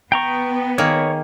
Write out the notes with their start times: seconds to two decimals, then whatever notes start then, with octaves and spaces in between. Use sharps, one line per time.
0.12 B3 G5 A#5 C#6
0.78 D#3 A#3 G#4 C#5